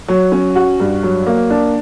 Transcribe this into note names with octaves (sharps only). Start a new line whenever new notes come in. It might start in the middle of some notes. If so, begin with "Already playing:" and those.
F#3
C#4
F#4
G2
F#3
A#3
D4